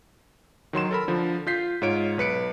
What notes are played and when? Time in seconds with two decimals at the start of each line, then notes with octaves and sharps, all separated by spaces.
0.73 D#3 F#3 C6 E7
0.91 A4 A#4 B5
1.08 D3 F3
1.47 F4 G6 B6 C7
1.82 G#2 F4 C#5 D7
2.18 B1 B4 C#7 D7